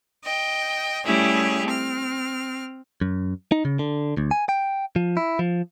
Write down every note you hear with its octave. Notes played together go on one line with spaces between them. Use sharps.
D#5 G5
G3 A3 C#4 E4 G4 G#4
C4 F6
F#2
D#4
C#3
D3
D2
G#5
G5
F3
E4
F3